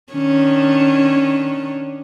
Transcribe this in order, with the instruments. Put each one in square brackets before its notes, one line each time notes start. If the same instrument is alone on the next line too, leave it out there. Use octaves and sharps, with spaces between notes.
[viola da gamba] D#3 C#4 D4